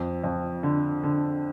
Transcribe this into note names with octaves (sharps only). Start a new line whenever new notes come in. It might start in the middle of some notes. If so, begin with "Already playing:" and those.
Already playing: F2
F2
D3
D3